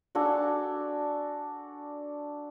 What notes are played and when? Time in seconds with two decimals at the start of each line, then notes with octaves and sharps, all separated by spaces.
0.15 D4 F#4 A4 G#5